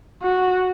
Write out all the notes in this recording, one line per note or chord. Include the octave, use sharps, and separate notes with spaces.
F#4